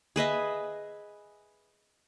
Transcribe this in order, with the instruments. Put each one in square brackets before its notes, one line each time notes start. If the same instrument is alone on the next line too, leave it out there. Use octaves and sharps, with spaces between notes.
[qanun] G#4 B4 D#5 E5